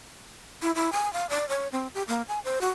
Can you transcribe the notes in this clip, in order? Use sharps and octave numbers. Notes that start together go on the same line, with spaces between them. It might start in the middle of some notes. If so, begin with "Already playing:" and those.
E4
E4
G#5
F5
D5
C#5
C4
G4
A#3
G#5
C5
F#4